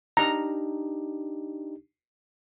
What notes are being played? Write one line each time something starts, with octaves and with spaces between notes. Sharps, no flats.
D4 D#4 G4 A#5